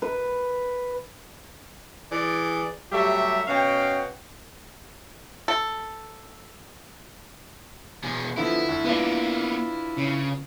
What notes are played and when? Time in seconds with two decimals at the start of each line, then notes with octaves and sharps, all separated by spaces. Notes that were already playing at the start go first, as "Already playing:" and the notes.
0.02 B4
2.12 E3 G#4 D5
2.92 F#3 G3 A3 G4 E5
3.48 B2 C#4 F#4 F5 G5
5.48 A4
8.04 B2 G#4
8.37 D3 F3 B3 E4
8.69 D2
8.85 A#3 B3 D4 F4 B4
9.97 C#3